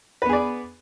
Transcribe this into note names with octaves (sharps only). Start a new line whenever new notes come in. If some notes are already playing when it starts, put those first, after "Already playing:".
B3 G#4 B4 D5